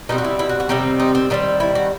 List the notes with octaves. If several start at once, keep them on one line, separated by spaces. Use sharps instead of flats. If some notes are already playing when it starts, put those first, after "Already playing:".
B2 G3 C4 D#4
F#4
E4
E4
F#4
F#4
C3 D#3 G3 C4 D#4
D#4
C4
D#3 G3 C4 D#4
E4
F#4